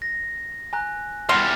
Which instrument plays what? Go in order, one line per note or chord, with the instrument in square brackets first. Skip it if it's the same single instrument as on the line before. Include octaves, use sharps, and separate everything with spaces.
[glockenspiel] A#6
G#5 A#5 F#6
[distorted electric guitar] E2 G3 [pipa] C6 [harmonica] F6